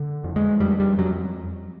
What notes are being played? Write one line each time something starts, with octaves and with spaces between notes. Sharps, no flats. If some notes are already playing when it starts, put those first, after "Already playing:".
Already playing: D3
F2
G#3
F2 G3
G3
F2 F#3